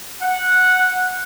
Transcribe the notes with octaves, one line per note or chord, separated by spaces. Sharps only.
F#5